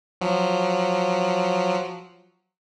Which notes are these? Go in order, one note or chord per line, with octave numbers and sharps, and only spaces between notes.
F3 F#3